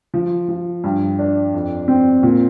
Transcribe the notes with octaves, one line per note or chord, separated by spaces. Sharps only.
F3
F3
G2
D4
F2
C4
A#2